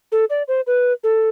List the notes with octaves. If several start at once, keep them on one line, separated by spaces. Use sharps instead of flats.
A4
D5
C5
B4
A4